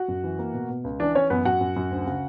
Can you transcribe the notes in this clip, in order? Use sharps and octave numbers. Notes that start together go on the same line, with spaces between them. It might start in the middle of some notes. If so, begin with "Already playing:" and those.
Already playing: F#4 F#5
F#2
E3
A#3
B2
B2
C#2
E3 D4 D5
E3 C#4 C#5
F#2 B3 B4
F#2 F#4 F#5
F#2
F#2
D2
C#3